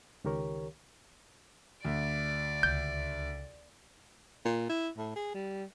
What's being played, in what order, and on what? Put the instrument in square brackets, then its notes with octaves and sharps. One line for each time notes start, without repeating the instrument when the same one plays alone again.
[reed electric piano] C#2 D#3 G4 A#4 C#5
[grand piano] D2 [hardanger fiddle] D5
[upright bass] C#2 [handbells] G6
[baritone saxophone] A#2
E4
A2
G#4
G3